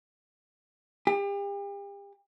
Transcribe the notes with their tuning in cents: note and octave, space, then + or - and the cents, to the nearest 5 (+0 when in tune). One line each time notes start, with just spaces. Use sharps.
G4 +40